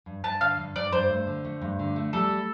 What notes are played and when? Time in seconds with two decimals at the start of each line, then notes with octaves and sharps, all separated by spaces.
0.06 G2
0.24 G2 A5
0.41 D3 F5
0.58 G2
0.76 G2 D5
0.92 G2 C5
1.09 A3
1.27 D3
1.44 A3
1.61 G2
1.79 D3
1.96 A3
2.13 G3 A4